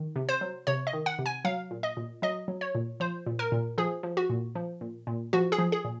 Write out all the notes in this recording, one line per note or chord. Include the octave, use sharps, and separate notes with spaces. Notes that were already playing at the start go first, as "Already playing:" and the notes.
Already playing: D#3
C3
C5
F#3
C3 C#5
D#5
D#3
F#5
C3
G#5
F#3 F5
A#2
D#5
A#2
F#3 D#5
F#3
C#5
A#2
F3 C5
A#2
A#4
A#2
F3 G#4
F3
F#4
A#2
F3
A#2
A#2
F3 F#4
G#4
F3
G#4
A#2